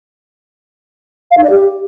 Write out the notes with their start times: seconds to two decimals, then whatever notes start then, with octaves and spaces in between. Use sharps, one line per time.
1.31 F5
1.37 D#4
1.43 D5
1.50 G4